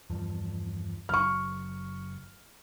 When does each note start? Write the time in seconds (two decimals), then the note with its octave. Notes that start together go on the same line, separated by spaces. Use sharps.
0.10 E2 G2 F3
1.09 F#1 F#3 C#6 F6